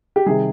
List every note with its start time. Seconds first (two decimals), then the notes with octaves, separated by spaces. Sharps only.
0.16 G4
0.26 C3 D#3 G3 G#4